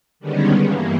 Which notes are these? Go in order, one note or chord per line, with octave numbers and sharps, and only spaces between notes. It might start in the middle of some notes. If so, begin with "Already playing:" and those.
D3 D#3 G3 G#3 B3 C#4
G2 E3 A#3